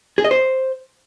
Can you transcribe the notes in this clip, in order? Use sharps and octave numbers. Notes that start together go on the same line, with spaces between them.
G#4
D#5
C5